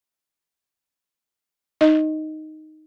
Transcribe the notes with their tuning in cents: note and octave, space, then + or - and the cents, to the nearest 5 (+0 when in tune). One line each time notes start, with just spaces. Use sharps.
D#4 +0 D#5 +0